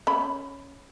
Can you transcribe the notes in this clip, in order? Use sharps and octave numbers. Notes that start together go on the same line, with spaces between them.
C#4 B5